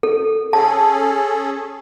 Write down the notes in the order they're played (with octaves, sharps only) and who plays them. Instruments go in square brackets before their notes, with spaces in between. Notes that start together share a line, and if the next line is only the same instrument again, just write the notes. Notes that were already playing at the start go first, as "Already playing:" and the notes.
[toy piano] A4
[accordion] C#4 G#4 A4 [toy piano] A5